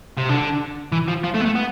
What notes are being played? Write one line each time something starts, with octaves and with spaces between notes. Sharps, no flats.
C3
D3
E3
F3
F3
A3
B3
A3
B3